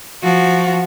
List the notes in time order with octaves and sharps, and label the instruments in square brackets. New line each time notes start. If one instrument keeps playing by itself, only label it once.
[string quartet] F3 F#4